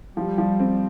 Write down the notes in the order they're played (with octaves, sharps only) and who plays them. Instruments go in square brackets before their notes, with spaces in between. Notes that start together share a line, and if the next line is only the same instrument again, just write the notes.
[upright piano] F3 [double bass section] G3
[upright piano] F3
C4